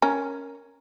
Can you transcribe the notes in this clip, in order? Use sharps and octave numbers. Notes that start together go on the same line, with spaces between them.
C#4 A#4